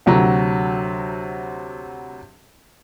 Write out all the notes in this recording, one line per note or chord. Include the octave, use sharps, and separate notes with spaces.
D2 C3 F#3 A#5